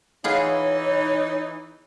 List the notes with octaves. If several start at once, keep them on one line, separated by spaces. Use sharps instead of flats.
E3 B3 D#4 F4 G#4 C#5